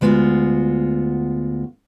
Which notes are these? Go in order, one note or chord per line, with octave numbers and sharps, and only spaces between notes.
D2 G#3 B3 F4 F#4